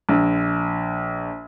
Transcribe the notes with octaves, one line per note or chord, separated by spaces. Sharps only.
A#1